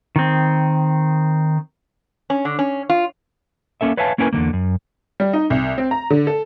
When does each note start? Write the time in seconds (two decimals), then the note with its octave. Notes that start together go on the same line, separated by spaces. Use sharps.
0.16 D#3 C4
2.30 C#4
2.45 D3
2.59 C#4
2.89 F4
3.81 A#3 C#4 A4 E5
3.97 B4 C#5 E5 F5 G#5 A5
4.18 A#3 C#4 E4 A#4 B4 G#5
4.33 E2 D3 E3 A#3
4.53 F#2
5.20 G3
5.33 D#4
5.50 C2
5.78 C4
5.91 A#5
6.10 D3
6.27 A4